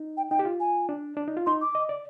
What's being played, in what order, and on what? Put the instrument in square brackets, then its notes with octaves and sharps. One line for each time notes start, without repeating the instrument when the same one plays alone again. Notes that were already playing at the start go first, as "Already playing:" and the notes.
Already playing: [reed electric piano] D#4
[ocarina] G5
[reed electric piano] D#4 [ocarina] G5
[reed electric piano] G4
F4
[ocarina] G#5
[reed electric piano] D4
D4
D#4
F4
[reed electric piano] D#4 [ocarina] C6
[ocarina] D6
[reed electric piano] D#5
D5